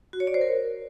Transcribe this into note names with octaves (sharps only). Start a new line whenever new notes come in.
F#4
C#5
D5
C5
A#4